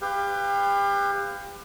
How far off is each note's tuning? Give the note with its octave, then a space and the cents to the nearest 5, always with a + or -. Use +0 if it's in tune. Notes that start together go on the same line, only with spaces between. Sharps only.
G4 +30 B4 +30 F5 +0